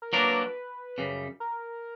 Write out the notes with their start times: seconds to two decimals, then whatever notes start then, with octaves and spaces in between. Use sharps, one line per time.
0.02 A#4
0.13 F#3 A#3 D4 A#4 B4
0.98 F#2 C#3 G3
1.40 A#4